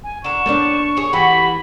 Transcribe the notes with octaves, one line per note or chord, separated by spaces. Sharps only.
G#5
D3 A#4 C#6 E7
A2 A#3 C#4 D4 D5
G#4 C#5
E3 F#4 G4 A4 B5